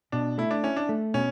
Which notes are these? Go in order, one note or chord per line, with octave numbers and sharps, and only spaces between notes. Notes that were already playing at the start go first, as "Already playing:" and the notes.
B2 D4
A3 E4
D4
C#4 E4
D4
A3
B2 C#4